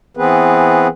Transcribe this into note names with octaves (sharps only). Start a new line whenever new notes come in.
E3 B3 C4 G#4 B4